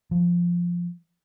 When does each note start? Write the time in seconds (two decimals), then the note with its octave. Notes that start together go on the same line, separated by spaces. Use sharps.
0.11 F3